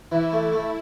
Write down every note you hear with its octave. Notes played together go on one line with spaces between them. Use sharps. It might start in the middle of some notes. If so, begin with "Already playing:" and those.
E3 E4
A3
A3